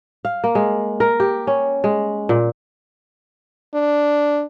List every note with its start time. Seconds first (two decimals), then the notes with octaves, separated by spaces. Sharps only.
0.25 F5
0.44 A#3
0.55 G#3
1.00 A#4
1.20 G4
1.47 C#4
1.84 G#3
2.29 A#2
3.75 D4